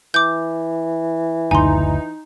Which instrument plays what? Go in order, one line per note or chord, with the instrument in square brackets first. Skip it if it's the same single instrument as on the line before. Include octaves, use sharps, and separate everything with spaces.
[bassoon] E3 [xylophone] D6 G6
[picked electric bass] F#1 D2 [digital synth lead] D#4 [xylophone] G#5 C6